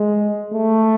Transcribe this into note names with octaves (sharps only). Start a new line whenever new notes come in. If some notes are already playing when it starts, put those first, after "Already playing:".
Already playing: G#3
A3